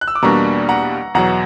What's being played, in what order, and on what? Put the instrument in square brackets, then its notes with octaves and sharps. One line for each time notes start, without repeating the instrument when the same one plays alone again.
[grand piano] F#6
E6
D6
[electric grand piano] E2 B2 G3 A#3 D4 [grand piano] A#5 C#6
[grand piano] F#5 A#5
[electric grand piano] E2 B2 F#3 [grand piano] F#5 A#5